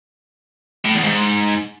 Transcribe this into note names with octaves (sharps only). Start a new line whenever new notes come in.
A2
E2
G#2